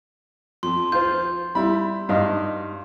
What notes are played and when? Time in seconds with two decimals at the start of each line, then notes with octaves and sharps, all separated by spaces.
0.63 F2 C6
0.92 F4 C5 G6
1.55 G3 E4 B5
2.09 G2 D#4 D#5 F5